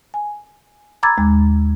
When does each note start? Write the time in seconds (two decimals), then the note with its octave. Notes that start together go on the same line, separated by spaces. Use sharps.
0.14 G#5
1.03 A#5 B5 D6 E6 G#6 A6
1.18 D#2 G#3